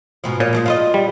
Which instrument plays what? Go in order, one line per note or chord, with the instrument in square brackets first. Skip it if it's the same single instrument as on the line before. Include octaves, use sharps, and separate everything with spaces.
[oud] G#2 B2 F3
[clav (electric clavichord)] A#2 [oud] C#5
[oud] F3 F#3 G#3
F4 C5 D#5
[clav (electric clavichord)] G3